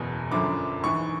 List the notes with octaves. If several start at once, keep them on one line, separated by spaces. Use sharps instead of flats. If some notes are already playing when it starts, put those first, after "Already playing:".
Already playing: F#1 E2 B2
G1 F#2 D3 F3 D6
A#1 G#2 E3 C#6